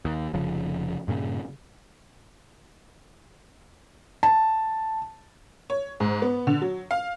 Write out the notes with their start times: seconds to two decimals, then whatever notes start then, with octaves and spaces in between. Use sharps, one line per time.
0.05 D#2
0.33 F1 C#3 F3
1.08 G2 A#2 C#3
4.23 A5
5.70 C#5
6.00 G#2
6.22 B3
6.47 D3
6.62 F#3
6.91 F5